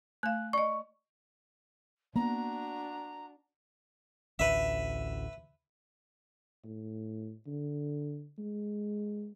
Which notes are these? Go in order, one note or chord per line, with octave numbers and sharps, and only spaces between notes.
A3 F5 F#6
D5 D#5 C#6
A#3 B3 D4 F#4 A#5
A1 D2 B4 E5
A2
D3
G#3